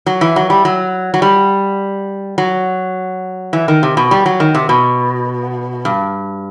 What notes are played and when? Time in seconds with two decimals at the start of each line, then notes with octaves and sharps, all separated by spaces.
0.06 F#3
0.21 E3
0.36 F#3
0.50 G3
0.65 F#3
1.14 F#3
1.22 G3
2.38 F#3
3.53 E3
3.68 D#3
3.83 C3
3.97 B2
4.11 G3
4.26 F#3
4.40 D#3
4.55 C3
4.69 B2
5.85 G2